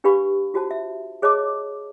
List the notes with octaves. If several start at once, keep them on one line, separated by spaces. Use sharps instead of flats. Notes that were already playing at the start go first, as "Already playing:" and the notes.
D4 G4 B4 F5 B5 C#6
F4 F#4 C5 A5
E5
G#4 C#5 D#5 A5 D6